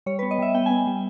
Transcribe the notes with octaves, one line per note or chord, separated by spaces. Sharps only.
G3 C#5
B3 B4
D#5
G3 E5
B3 G5
B3 G#5
G3